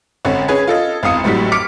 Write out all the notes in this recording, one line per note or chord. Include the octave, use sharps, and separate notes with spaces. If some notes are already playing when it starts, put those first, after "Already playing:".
G#1 D3 C#4
C#4 G#4 B4 G#6
F4 A4 D#5
G#1 E2 F5 D#6 C#7
G#1 A2 F#3 G3 B6
D6 F6 B6 C#7 D7